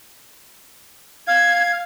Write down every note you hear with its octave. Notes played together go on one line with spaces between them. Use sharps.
F5 G#6